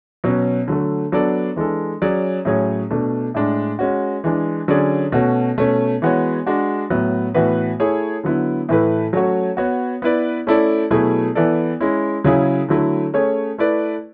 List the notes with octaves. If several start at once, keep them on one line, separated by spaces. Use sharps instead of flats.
B2 F#3 C#4
D3 F#3 A3
F#3 B3 D4 A4 D5
E3 G#3 D4 A4
F#3 C#4 G#4 D5
A2 F#3 C#4 G#4 C#5
B2 A3 D4
A2 G#3 D4
G#3 C#4 F#4
E3 G#3 D4
D3 F#3 C#4 G#4 D5
B2 A3 C#4 F#4
B2 A3 C#4
E3 G#3 B3 F#4 C#5
G#3 D4 F#4
A2 F#3 B3
A2 E3 B3 F#4 B4
A3 E4 G#4 C#5
D3 F#3 B3 E4
A2 E3 A3 E4 B4
F#3 A3 C#4 F#4 C#5
B3 F#4 C#5
B3 E4 B4 D5
A3 C#4 E4 A4 D5
B2 F#3 A3 E4 G#4
E3 B3 E4 A4 D5
G#3 C#4 E4
C#3 F#3 C#4 E4 G#4
D3 F#3 A3 E4
A3 C#4 G#4 C#5
A3 E4 B4 D5